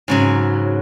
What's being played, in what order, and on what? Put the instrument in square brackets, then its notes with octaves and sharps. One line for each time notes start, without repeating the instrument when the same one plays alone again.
[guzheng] G#2 C#3 F#3